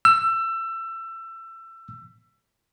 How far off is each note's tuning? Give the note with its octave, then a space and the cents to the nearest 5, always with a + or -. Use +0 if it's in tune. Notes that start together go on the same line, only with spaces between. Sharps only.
E6 +25